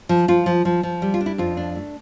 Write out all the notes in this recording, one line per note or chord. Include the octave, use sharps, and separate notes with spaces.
F3
F3 F4
F3
F3
F3
G3
F4
D4
E4
F2 F4
D4
A3